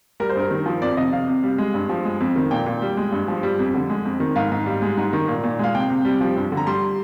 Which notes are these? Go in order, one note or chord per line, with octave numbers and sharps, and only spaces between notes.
G3 A#4
C5
G2 A#4
D#3
F3
F2 D5
C3 D#5
C3 F5
C3
G3
G#3
G2
F3
G#3
F2
D#3
A#2 G5
A#2
G3
G#3
G2
F3
G3
F2
D3
G#3
F2
D#3
G#2 F5
G#2
G3
G#3
G#2
D#3
A#2
A#2
G#3 F5
C3 G5
C3
G3
F3
G2
D3
A#5
G3 C6